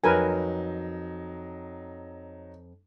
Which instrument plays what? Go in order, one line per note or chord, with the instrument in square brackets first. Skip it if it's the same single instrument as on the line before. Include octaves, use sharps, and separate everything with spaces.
[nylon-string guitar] F2 [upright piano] F#3 D#4 [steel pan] A#4 B4 G#5